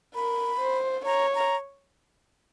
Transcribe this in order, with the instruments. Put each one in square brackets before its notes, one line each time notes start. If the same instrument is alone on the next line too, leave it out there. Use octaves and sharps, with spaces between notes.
[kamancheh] A#4 [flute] B5
[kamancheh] C5
[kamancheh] C#5 [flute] A#5
[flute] A#5